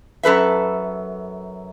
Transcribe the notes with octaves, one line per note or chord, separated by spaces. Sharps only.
F#2 A4 B4 E5